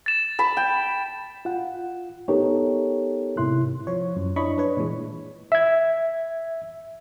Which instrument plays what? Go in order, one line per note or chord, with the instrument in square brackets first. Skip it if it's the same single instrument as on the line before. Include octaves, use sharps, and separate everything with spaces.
[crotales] A6 E7
[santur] A5 B5
G5
[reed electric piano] F4 F#5
B3 D#4 G4 A4 A#4 C#5
G#2 C3 E4 C6 F#6
[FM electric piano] F3 C#5
F#2
D4 E4 C#5 D#5 B5 C#6
D4 B4 C#5
A#2 E3 G#3
[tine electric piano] E5 G#6